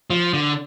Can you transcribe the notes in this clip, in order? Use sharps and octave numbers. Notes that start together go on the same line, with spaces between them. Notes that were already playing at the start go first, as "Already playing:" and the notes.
F3
D3